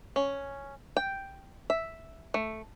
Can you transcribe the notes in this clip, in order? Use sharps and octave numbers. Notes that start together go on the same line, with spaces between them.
C#4
G5
E5
A3